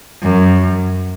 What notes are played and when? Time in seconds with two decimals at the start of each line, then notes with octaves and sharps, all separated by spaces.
0.22 F#2